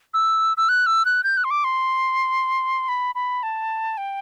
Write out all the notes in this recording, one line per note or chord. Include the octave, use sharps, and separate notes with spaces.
E6
E6
F#6
E6
F#6
G6
F#6
C6
D6
C6
B5
B5
A5
G5